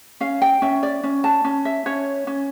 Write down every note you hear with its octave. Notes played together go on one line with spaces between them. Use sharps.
C#4 F5
G5
C#4 E5
D5
C#4
A5
C#4
E5
C#4 C#5
C#4